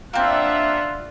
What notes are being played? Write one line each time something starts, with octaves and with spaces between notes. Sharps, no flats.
A#3 C4 D4 F4 E5 F#5